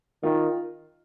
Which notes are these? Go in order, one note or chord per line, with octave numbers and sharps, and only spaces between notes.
D#3 F4